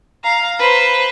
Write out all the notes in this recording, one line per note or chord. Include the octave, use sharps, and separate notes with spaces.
F5 A#5
B4 C5